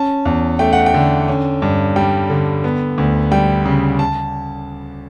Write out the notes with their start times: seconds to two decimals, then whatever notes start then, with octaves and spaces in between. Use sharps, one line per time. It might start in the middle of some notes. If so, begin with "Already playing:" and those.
Already playing: C#4 A5
0.25 E2
0.59 A3 G5
0.73 F#5
0.86 G5
0.94 D3
1.28 C#4
1.62 G2
1.96 G3 G5
2.30 D3
2.64 B3
2.98 D2
3.31 G3 G5
3.65 C#3
3.99 A5